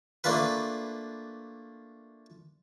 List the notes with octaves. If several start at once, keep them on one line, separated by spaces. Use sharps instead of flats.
A3 A#3 D4 F4 B4